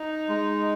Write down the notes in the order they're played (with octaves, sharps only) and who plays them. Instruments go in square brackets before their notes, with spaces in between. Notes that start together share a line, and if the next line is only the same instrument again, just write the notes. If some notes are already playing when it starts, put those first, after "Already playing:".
Already playing: [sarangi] D#4
[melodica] G#3